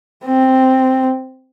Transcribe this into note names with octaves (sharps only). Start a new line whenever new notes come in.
C4